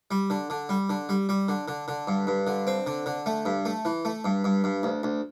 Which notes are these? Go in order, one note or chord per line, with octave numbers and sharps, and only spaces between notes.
G3
D3
D3
G3
D3
G3
G3
D3
D3
D3
G2
G2
D3
C4
D3
D3
A3
G2
A3
E3
A3
G2
G2
G2
D2
D2